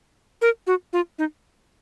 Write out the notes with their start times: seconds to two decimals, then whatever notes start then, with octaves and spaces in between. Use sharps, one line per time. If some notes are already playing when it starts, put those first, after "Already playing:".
0.42 A#4
0.67 F#4
0.93 F4
1.19 D#4